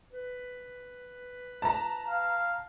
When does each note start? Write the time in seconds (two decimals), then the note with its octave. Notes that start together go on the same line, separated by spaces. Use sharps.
0.13 B4
1.62 A5 A#5
2.08 F5